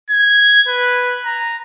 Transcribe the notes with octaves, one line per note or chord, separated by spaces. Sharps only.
G#6
B4
A#5